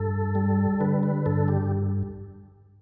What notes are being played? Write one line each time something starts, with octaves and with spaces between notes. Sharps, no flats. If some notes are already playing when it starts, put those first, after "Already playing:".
Already playing: G2 A4
G3
D3 B4
B4
G2 A4
G4